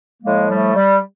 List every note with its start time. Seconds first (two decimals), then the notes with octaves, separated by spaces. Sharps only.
0.21 A2 F3 G#3 A#3
0.48 G3 A3
0.74 G3